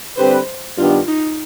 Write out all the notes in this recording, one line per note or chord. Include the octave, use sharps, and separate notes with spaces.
D3 G3 C4 G4 B4 C5
G2 D#3 B3 D4 F4 G4
D#4